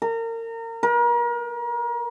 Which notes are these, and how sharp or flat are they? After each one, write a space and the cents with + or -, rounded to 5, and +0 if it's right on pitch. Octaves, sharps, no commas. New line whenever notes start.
A#4 -30
A#4 +35